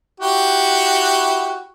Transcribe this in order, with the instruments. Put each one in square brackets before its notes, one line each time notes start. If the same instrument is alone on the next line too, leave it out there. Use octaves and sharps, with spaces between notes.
[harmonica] E4 F#4 G4